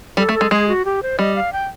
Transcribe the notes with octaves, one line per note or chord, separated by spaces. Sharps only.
G3 A4
A3
A4
G#3
G#3 G#4
F#4
G4
C5
G3 D#5
F5
G5